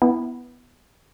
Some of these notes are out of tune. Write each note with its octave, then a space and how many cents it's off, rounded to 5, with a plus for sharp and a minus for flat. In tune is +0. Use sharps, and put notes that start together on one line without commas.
B3 +0 E4 +0